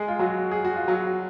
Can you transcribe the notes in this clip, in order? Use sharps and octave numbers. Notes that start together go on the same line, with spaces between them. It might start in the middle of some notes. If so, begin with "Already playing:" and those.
Already playing: G#3 G#4
F4
F#3 F#4
G#4
F#4
F4
F#3 F#4